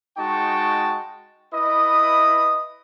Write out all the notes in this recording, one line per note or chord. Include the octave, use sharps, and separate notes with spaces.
G#3 D#4 F#4 G5 A5 C#6
E4 B4 D#5 D#6